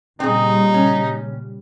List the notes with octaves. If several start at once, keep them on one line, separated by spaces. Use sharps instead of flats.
A#2 C#3 G3 C4 D#4 G#4
C#4